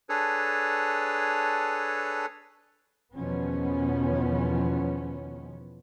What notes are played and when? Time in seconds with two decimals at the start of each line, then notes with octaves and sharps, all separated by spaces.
0.09 D4 G#4 A4 B4 C#5
3.16 E2 B2 D#3 F3 B3 C#4